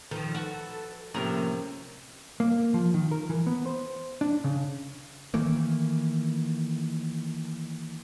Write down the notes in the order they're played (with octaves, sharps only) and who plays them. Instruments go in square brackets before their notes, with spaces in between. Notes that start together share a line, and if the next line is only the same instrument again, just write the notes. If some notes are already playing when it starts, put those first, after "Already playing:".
[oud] D#3 F3 [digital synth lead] A4 [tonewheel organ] B4
[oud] F#4
[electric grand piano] A2 C3 [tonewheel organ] F3 A#3 [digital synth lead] C#4 [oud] A#4
[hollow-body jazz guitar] A#3
F3
D#3
A#4
E3
B3
C5
D4
C#3
[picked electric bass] D#3 E3 A3 A#3